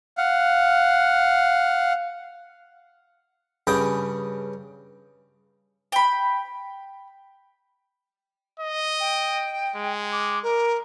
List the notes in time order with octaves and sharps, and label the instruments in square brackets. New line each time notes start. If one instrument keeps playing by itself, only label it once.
[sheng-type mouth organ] F5 F#5
[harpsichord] G2 C#3 G5 G#5 B5 D#6
[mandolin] G5 B5
[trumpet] D#5
[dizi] G5
[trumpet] G#3
[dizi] D6
A#4